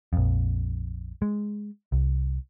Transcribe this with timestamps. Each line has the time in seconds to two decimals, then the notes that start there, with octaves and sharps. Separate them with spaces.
0.13 A#1 F2
1.22 G#3
1.92 C2